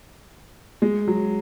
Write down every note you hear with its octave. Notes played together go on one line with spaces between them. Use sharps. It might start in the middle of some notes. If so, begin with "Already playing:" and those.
G#3
F#3